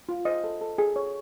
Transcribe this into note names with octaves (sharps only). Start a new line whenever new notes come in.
F4
C5 D#5
A4
A4
G#4
C#5